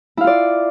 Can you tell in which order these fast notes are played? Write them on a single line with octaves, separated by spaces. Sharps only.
E4 F5 F4 D5